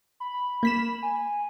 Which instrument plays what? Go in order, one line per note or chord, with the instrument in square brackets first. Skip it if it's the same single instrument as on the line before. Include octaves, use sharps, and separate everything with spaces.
[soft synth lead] B5
[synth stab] A#3 B6 E7
[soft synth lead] G#5